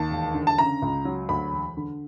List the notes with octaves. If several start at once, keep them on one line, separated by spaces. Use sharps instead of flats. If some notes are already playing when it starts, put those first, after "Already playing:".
Already playing: D#2 A5
E1
D3
A5
C#3 A#5
C#2
F#3
D2 B5
E1
D3